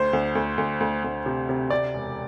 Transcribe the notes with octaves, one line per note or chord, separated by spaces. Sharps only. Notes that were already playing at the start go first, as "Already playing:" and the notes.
Already playing: D2 C5
D2
D2
D2
D2
D2
C3
C3
C3 D5
E1